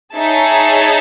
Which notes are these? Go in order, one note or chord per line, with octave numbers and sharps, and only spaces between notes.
D#4 G#4 C#5 E5 A5